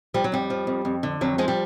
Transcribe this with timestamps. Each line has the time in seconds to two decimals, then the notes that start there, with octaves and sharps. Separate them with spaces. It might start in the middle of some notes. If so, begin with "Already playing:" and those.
0.14 F3 G3
0.24 F#3
0.32 F2 G3
0.50 F3
0.67 F2
0.85 F2
1.03 D3
1.21 F2 F#3
1.38 F3 G#3
1.48 G3